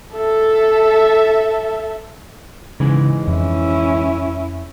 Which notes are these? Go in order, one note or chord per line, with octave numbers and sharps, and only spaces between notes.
A4 E5
G#2 C#3 E3 G#3
F2 C#4 E4